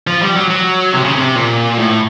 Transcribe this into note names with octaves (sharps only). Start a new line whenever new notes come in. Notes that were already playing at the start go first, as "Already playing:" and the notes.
F3
G3
F#3
F#3
C3
C#3
C3
A#2
A2